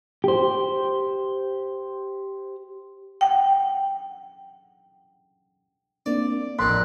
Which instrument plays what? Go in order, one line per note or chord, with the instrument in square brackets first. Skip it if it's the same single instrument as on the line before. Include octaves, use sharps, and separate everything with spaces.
[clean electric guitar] G4 C5
[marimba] F#5 G5
[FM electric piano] A#3 C4 D4 [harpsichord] D5
[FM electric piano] A1 A5 B6 [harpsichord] F2 A#2 D#3 [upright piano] C6 [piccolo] F#6